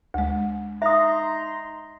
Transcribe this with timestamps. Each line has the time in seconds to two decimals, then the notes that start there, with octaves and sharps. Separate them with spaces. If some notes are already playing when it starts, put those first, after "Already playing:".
0.14 D2 G#3
0.82 D#4 E5 A#5 C6 D#6